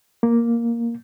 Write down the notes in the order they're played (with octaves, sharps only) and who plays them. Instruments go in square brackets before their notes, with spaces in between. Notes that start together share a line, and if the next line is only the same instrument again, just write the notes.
[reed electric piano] A#3